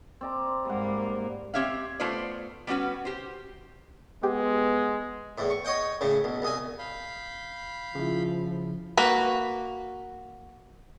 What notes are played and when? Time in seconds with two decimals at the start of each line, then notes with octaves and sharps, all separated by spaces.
0.21 C4 D5 A#5
0.65 G#2 G3 A#3 F#5
1.54 C4 G4 C#5 E5 F5
2.00 A3 B3 F4 C5 D5
2.67 G3 B3 C#4 F#4 B4
3.05 G4 C5
4.23 G#3 B3 G4
5.38 E2 A2
5.50 C#6
5.65 C#5 D#5 F#5 G5
6.01 A2 C#3
6.24 B1
6.42 C2 D#5 G#5
6.79 F5 B5 G6
7.95 C#3 F3 E4
8.97 A#3 F#4 B4